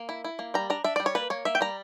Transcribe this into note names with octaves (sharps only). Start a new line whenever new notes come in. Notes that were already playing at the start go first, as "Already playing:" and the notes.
Already playing: A#3
E4
E4
A#3
G3 A#5
D4 A#5
D4 E5
G3 D5
C#5
A#3 B4
A#3 C#5
A#3 E5
G5
G3 A#5